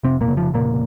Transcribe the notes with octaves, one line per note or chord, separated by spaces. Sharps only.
F1 C3 C4
A#2 A#3
C#3
F3
F1 A#2 A#3